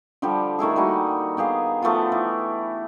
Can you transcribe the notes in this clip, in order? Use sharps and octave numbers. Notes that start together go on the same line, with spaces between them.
D3 F3 G3 G4
D#3 A3 E4 G#4
G3 A#3 D#4 F#4
B3 G4 G#4 F5
F3 A3 B3 F4
E3